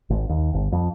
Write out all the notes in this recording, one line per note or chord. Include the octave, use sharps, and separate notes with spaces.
G#1
D#2
G1
F2